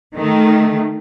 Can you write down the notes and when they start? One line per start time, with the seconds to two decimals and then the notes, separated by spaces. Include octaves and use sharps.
0.16 D#3 A3